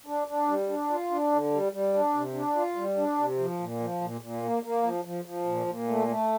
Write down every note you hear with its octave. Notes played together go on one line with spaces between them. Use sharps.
D4
D4
G3
D4
F4
D4
D3
G3
G3
D4
C3
D4
F4
G3
D4
C3
F3
A#2
F3
A#2
A#2
A#3
A#3
F3
F3
F3
A#2
A#2
A3
A3